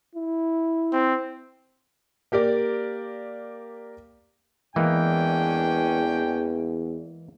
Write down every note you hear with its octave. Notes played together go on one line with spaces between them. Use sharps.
E4
C4
A#3 G4 A#4 D5
E2 E3 G#3 A#3 C#4 D4 G5